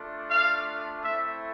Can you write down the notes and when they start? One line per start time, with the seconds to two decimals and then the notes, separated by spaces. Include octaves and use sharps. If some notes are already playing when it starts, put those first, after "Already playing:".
Already playing: A3 D4 F4
0.30 F5
1.03 A3 C4 E4 E5